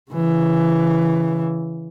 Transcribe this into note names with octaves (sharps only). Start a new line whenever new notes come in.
C#3 E3